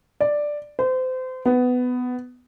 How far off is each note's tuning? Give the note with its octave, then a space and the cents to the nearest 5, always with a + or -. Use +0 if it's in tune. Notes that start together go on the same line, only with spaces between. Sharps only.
D5 +5
C5 -30
B3 +10